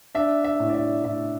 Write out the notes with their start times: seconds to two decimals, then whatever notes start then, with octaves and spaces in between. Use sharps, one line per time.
0.15 D4 E5
0.44 E5
0.60 A2
0.69 D5
0.74 E5
1.04 A2 E5